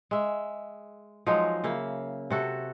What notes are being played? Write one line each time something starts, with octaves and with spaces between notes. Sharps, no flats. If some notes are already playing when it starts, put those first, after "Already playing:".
G#3 E5
F3 F#3 G#3 D#4
C#3 A#3 E5
C3 F#4 A4